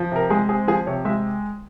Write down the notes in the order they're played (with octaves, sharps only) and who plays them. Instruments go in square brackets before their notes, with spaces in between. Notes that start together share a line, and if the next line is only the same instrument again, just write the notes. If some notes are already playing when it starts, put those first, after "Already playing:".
Already playing: [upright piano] F3
C3 A#4
G#3 G#4
C4 G#4
F3 G#4
C3 C#5
G#3 E5